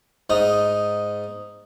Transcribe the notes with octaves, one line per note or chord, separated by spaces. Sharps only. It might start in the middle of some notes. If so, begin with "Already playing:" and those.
G#2 D#4